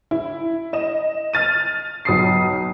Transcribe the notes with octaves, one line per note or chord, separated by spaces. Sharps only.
E4
D#5 E7
F6 A6 D#7
B1 D#6 C7